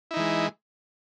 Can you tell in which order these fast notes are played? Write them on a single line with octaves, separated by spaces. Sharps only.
E4 D#4 E3 G#3